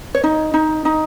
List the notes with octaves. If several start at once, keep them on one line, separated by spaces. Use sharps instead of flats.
C#5
D#4 D#5
D#4
D#4